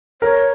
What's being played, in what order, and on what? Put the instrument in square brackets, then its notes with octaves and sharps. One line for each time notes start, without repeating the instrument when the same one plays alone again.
[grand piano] A#4 [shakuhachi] C#5